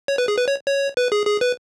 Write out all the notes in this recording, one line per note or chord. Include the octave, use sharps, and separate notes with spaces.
C#5
B4
G#4
B4
C#5
C#5
B4
G#4
G#4
B4